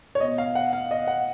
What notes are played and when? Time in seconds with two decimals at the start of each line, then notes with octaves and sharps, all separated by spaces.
0.15 C#5
0.20 B2 D#5
0.38 F5
0.55 F#5
0.73 F5
0.91 D#5
1.07 F#5